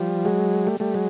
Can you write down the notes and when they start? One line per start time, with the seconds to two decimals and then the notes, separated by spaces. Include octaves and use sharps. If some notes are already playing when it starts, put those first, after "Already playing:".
Already playing: F3 G3
0.25 F#3 G#3
0.67 G3 A3
0.80 G3 A3
0.94 F#3 G#3